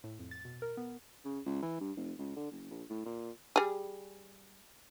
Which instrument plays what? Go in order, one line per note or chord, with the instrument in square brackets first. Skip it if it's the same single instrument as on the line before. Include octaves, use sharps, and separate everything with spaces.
[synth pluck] A2
F2
A6
B2
A#4
B3
[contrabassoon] C#3
C#2
E3
G2
F1
C#2
D3
F#1
A#1
A2
A#2
[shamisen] G3 G#4